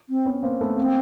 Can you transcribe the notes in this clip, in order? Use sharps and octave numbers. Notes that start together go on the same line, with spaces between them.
C4
B3 C#4
A#3 C4
A3 B3
A#3 C4